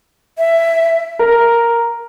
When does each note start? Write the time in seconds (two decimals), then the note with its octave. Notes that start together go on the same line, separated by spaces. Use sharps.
0.38 E5
1.19 A#4